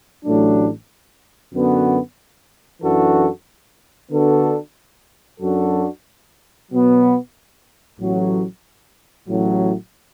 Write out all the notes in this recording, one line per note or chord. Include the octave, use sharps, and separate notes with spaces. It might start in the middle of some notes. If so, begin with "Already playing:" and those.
A1 A2 F#3 A3 D4
F#2 D3 B3 F#4
F#2 E3 D4 F#4 A4
D3 B3 D4 F#4 A4
F#2 F#3 D4 F#4 A4
B2 F#3 B3
A1 A2 F#3
A1 A2 F#3